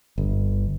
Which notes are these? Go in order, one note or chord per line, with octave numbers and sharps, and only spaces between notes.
G1